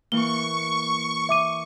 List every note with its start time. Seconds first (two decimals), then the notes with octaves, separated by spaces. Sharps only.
0.12 E3 A#3 C#6 G7
1.29 E5 D6 D#7